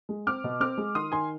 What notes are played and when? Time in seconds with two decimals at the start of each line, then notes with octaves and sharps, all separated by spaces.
0.09 G#3
0.27 C4 D6 F6
0.44 B2
0.60 C4 D6 F6
0.78 G#3
0.95 D#3 C6 D#6
1.12 D#3 G#5 C6